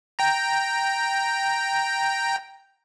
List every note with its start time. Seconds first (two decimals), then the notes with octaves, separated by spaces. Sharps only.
0.19 G5 A#5